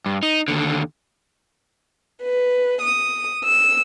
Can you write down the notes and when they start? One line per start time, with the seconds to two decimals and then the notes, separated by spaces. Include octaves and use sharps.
0.06 G2
0.23 D#4
0.48 D#2 D3
2.22 B4
2.81 D#6
3.44 E6